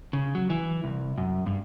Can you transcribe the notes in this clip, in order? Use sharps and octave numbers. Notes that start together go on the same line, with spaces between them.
C#3
F#3
E3
C2
F#2
G2